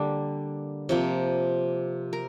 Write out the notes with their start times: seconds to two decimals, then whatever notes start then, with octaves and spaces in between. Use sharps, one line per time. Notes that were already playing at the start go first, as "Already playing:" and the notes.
Already playing: D3 G3 A#3 D4
0.89 C3 F3 A#3
2.13 A#4